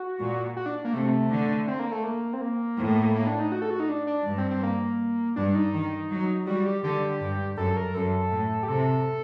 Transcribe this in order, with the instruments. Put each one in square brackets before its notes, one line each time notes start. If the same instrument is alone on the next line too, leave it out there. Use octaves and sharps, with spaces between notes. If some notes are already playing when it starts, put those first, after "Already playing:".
Already playing: [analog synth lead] F#4
[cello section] A#2
[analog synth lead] F#4
D4
A#3
[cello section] C3 [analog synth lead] A3
[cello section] D3
[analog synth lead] C4
A#3
A3
A#3
C4
A#3
[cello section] A2
[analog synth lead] A#3
D4
D#4
F#4
A4
F#4
D#4
D4
D4
[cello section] G2
[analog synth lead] C4
C4
A#3
[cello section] G2 [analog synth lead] D4
[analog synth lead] D#4
[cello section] D#3
F#3
[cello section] G3 [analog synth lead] F#4
[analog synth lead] G4
[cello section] D3 [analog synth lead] G4
[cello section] G2
[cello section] F#2 [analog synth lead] A4
[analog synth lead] A#4
[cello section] F#2 [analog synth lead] A4
[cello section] A2
[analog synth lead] G4
[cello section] C3 [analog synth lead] A4